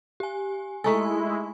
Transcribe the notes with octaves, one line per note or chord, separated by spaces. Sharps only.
G4 G#5
G#3 A3 D#4 E4 A4 G#5 C#6